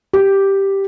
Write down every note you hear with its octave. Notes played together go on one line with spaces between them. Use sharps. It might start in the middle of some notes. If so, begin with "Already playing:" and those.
G4